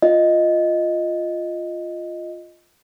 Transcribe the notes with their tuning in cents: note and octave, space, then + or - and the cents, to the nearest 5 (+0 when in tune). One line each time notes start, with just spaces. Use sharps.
F4 +0 D#5 +0